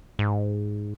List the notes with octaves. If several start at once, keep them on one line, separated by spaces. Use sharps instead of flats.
G#2